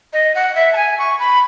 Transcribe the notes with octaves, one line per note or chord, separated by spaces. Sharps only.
D#5
F#5
E5
A5
G#5
C#6
B5